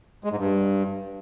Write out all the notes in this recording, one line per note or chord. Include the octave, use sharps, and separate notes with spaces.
G#3
G#2
G2